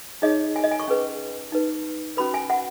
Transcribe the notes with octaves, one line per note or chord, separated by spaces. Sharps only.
D#4 G#4 C#5 D#5
G#5
D#5
G#5
C#6
C#4 G#4 B4
D#4 B4
C#4 F#4 B4 B5
G#5
F#5